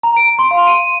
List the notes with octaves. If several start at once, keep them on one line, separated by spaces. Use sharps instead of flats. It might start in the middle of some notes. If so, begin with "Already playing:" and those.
A#5
D7
C6
F5
D#7